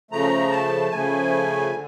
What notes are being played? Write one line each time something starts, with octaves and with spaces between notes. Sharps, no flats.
C#3 F3 A3 A#5
A5
C#3 F3 A3 G#5
D3